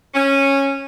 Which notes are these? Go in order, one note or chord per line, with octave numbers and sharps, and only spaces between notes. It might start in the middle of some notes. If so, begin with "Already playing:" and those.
C#4